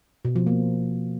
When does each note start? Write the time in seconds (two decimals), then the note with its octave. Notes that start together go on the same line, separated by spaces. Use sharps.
0.25 B2
0.36 F3
0.47 A#3